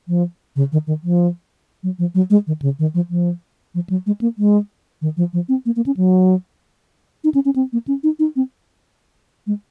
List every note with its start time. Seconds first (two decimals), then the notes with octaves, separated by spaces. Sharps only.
0.08 F3
0.56 C#3
0.72 D#3
0.87 D#3
1.04 F3
1.83 F#3
1.99 F3
2.15 F#3
2.30 G#3
2.47 D#3
2.62 C#3
2.79 D#3
2.94 F3
3.10 F3
3.75 F3
3.90 F#3
4.06 G#3
4.21 A#3
4.38 G#3
5.02 D#3
5.17 F3
5.33 F3
5.49 C4
5.66 A#3
5.76 A#3
5.86 C#4
5.97 F#3
7.24 D#4
7.34 C#4
7.45 C#4
7.56 C4
7.73 A#3
7.88 C#4
8.03 D#4
8.19 D#4
8.36 C4
9.47 G#3